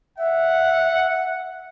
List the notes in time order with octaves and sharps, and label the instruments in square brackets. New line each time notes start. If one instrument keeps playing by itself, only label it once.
[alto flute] E5 [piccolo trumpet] F#5